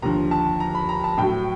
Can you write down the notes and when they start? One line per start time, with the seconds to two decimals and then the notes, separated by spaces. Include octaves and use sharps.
0.02 D#2 D3 F3 A#5
0.31 A5
0.60 A#5
0.75 B5
0.89 A#5
1.04 A5
1.18 A2 F#3 G5